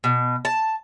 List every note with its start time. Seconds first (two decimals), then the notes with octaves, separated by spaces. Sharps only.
0.04 B2
0.45 A5